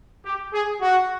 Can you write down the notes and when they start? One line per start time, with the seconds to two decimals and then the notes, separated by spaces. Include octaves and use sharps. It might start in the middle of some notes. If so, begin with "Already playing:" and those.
0.25 G4
0.53 G#4
0.81 F#4